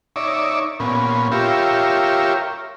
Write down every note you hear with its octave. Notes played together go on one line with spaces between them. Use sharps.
D#4 C#5 D5 E5
A#2 B3 C#4
F4 G4 A#4 C#5 E5